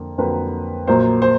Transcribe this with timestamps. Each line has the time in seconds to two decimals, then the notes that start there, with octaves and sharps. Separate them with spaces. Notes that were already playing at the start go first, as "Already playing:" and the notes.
Already playing: F2 D3 A#3
0.18 F2 D3 F#3 A#3 B4
0.87 A#1 A#2 F#3 A#3 C5
1.22 C5